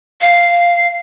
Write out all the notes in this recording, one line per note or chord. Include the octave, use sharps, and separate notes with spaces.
F5